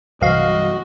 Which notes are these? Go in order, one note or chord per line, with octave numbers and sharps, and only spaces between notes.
C2 G2 E3 F#3 F#4 D#5 F5